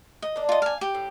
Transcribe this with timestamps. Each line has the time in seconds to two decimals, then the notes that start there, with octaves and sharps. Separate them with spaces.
0.22 D#5
0.36 A#3 D4
0.49 F4 D#5
0.62 F5 G#5
0.81 G4
0.95 A2